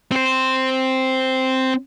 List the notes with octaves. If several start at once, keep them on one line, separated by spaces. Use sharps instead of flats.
C4 C5